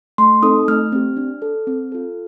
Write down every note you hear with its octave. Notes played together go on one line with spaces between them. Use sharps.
A3 C6
C4 D#4 A4 D#6
A3 F6
C4 G4
D4
A4
C4
F4 A4